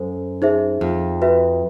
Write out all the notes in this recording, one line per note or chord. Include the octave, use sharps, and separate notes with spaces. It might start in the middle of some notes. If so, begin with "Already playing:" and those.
Already playing: F#2 A4 C5
D#4 G#4 C5 E5
F2
F#4 B4 E5